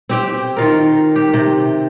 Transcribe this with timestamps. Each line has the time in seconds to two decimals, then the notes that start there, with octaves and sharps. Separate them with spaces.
0.09 C4 G4 G5
0.57 D#3 F4 A#4
1.16 G4
1.34 C3